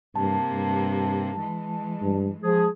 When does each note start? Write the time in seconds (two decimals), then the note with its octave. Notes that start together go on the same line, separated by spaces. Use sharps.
0.16 G2 C3 A#3 A5
0.52 G2
1.37 E3 G#3
2.02 G2
2.43 F3 G#3 G#4